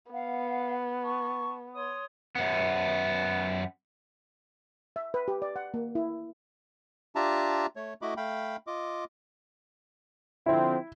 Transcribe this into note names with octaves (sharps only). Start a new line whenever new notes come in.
B3 F5 F#5
A5 C#6
C#5 C6 D#6
F#2 B3
E5
B4
G4
D5
F#5
A#3
E4
D4 F4 G4 E5 A5 A#5
A3 C#5
A3 E4 F#4 D#5 B5 D6
A3 F5 G5 B5
F4 D#5 D6
D3 F3 C4 E4